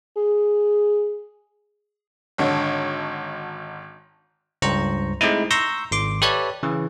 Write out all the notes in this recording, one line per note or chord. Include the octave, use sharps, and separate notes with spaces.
G#4
G#1 D3 C#5
C#2 G2 C5 A#5 C#6
G#3 A3 C4 D#4 E4
A#5 C6 C#6 E6 G6 A#6
G#1 C6 D6
G4 A4 B4 C#5 D5 E5
C#3 E3